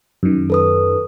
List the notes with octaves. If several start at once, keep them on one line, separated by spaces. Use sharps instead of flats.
F#2 D#3
A4 B4 D#6